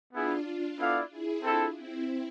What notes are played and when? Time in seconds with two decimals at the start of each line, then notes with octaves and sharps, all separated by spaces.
0.12 B3 D4 E4 F4 G#4
0.78 B3 E4 A4 D5 F5
1.10 E4 G#4
1.43 C4 D4 E4 F4 A4
1.76 C4 E4